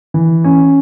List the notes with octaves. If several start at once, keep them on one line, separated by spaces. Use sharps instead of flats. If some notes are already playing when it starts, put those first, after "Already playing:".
E3
C#4